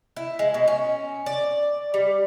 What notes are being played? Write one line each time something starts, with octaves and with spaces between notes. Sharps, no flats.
E4
G#3
B2
C#4
D5
G3